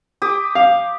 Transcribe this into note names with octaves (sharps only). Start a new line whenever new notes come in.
G4 D6 D#6
F5